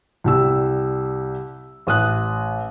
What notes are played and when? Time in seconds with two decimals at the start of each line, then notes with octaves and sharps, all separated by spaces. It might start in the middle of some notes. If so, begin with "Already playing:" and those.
0.24 C2 G3 E6
1.87 A1 D#6 F#6